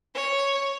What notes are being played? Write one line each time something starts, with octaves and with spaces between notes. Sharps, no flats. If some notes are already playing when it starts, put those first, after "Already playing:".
C#5